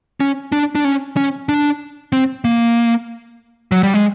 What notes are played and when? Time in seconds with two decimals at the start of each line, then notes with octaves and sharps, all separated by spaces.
0.20 C#4
0.52 D4
0.75 D4
0.84 C#4
1.17 C#4
1.49 D4
2.13 C4
2.45 A#3
3.72 F#3
3.83 G3
3.94 G#3